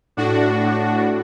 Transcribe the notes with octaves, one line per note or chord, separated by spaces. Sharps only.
A2 D4 F#4
A2